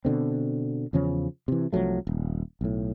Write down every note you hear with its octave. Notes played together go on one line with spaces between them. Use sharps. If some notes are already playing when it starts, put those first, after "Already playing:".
B2 D3 C4
E2 C#3 F3 C#4
C3 E3
C2 F3 F#3 A3
D#1
B1 A2